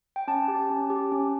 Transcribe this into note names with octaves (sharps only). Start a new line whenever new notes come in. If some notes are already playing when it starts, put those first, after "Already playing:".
G5
C#4 A5
G4
C#4
G4
C#4